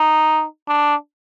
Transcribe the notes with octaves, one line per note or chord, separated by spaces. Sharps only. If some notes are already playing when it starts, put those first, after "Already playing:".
Already playing: D#4
D4